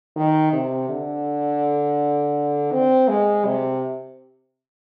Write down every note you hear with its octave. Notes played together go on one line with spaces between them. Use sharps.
D#3
C3
D3
C4
G#3
C3